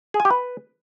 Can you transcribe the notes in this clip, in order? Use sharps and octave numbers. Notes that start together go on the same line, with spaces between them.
G#4
G#5
G4
B4